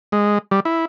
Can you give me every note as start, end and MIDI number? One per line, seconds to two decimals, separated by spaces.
0.12 0.38 56
0.51 0.60 55
0.65 0.85 64